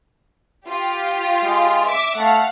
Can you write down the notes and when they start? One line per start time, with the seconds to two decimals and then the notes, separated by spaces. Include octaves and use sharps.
0.69 F4 G4
1.45 G#3
1.85 E5 D6
2.18 A3 F5 F#5